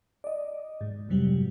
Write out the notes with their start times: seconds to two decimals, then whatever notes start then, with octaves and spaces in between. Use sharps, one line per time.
0.24 D5 D#5
0.81 G#2
1.09 F2 G#2 C3 F#3 G3